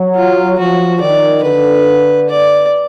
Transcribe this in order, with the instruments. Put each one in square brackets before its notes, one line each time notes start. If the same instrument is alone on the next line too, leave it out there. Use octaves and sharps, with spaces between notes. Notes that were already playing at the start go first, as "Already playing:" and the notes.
Already playing: [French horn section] F#3
[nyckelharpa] F4
[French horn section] F3 [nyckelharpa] F#4
[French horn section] D#3 [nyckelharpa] D5
[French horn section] D3 [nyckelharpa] B4
[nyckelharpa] D5